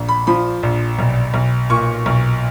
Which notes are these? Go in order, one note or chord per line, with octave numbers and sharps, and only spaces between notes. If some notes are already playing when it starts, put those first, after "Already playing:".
Already playing: A#1
B5
F3 B5
A#1
B1
B1
A#2 C#6
B1